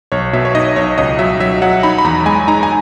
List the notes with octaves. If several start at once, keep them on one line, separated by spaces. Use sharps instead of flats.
B1 C#5
B2 E5
C#5
D#4 D#5
B1 C#5
C#2 D#5
F#3 E5
F#3 E5
F#3 F#5
D#4 B5
B5
E2 A#5
G#3 G#5
D#4 A#5
G#5